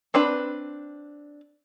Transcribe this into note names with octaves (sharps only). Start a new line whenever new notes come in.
C4 D4 B4 B5